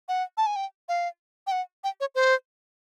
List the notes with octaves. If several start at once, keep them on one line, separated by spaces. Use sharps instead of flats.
F#5
A5
G#5
G5
F5
G5
F#5
G5
C#5
C5